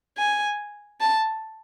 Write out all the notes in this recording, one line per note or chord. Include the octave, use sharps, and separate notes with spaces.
G#5
A5